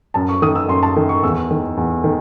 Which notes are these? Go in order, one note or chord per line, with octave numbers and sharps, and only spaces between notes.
F#2 A5
C#6
D#3 D#6
E6
F#2 C6
A5
D#3
C#6
E2 E6
D#3
E2
D#3